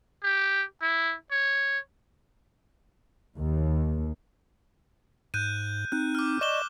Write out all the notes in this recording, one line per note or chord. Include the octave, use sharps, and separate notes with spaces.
G4
E4
C#5
D#2
G#2 F#6 G6 D#7
C4 D#4 F#6
D6 F6
D5 D#5 C#6 D6 E7 G7